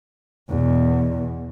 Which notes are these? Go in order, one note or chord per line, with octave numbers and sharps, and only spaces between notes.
E2 B2